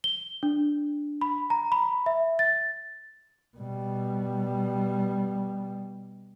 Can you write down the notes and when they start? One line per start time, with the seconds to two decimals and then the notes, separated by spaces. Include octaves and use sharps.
0.04 G7
0.43 D4
1.21 B5
1.50 A#5
1.72 B5
2.06 E5
2.39 A6
3.57 B2 G3